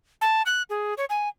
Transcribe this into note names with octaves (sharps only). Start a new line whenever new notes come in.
A5
F#6
G#4
C#5
G#5